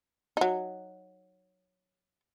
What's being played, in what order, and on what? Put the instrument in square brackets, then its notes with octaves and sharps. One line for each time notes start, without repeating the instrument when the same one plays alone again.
[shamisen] F#3 D#4